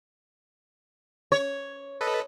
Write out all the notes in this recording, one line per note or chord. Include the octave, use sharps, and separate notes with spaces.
C#5
A4 B4 D#5